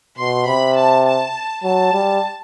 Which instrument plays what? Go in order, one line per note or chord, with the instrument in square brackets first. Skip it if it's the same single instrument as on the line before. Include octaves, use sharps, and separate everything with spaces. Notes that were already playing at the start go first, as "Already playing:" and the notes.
[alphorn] B2 [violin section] C6
[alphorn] C3 [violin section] B5
[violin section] A5
A5
[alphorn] F#3 [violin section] A5
[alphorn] G3